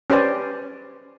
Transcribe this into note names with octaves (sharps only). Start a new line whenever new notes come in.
C#4 G4 B4 C5 D5 G#5